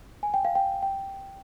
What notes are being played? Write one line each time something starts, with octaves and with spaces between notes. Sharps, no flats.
G#5
G5
F5
G5
G5